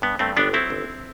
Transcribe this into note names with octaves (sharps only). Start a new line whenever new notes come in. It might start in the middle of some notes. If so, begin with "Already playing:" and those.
G2 B3
G2 A3 C4
G1 B3 D4
F#3 C4 E4
G1